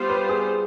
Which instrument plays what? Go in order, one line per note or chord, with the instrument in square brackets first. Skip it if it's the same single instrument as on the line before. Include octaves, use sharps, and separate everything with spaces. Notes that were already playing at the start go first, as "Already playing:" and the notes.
Already playing: [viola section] G3 B3 F4 C5
[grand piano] B4
G#4